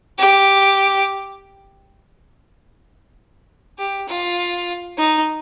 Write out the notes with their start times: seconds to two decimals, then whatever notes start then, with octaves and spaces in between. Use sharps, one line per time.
0.19 G4
3.79 G4
4.08 F4
4.98 D#4